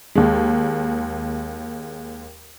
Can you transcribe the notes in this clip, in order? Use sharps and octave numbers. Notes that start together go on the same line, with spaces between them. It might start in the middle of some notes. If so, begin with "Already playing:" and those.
D#2 G#3